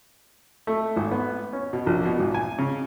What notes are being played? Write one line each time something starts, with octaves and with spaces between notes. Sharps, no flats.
A3
G#1
B3
C#4
B2
A#1
B2
G#1
G#5
C#3